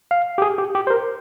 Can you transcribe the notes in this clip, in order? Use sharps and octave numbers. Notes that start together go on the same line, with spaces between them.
F5
G4
G#4
G4
G4
C5
A#4